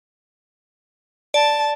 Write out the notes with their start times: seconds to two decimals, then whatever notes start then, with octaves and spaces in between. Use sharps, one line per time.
1.34 D5 A5